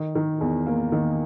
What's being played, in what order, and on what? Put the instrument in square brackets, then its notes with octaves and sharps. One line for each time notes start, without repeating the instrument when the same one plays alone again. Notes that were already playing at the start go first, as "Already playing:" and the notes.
Already playing: [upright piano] D#3
D#3
E2
A#3
D#3